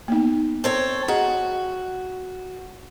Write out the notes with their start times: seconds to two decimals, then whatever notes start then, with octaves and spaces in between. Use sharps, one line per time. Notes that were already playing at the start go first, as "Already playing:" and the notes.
0.08 A#3 B3 D#4
0.64 C4 A4 C#5
1.08 F#4 G#4 D#5 A#5